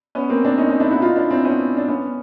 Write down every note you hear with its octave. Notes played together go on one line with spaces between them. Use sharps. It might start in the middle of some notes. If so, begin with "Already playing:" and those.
B3 C#4
A#3 C4
C4 D4
C#4 D#4
C#4 D#4
D4 E4
E4 F#4
D#4 F4
D4 E4
C4 D4
B3 C#4
D4
B3 C#4